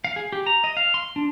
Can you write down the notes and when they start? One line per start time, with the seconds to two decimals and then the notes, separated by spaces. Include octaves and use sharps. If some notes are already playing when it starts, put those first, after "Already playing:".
0.04 F5
0.16 G#4
0.33 G4
0.46 A#5
0.64 D#5
0.77 F5
0.94 C6
1.16 D4